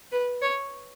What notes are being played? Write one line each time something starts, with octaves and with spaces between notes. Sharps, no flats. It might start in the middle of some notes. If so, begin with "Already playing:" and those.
B4
C#5